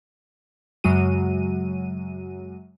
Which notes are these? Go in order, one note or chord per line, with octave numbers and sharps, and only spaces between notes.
F#2 C#3 F#3 G#3 F#4 D#7